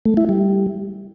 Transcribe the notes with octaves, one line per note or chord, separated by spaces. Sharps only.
A3
E4
G3